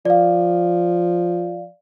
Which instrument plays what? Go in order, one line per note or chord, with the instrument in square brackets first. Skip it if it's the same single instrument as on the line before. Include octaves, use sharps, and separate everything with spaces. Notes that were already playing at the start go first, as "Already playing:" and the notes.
[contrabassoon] F3 [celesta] D5 F5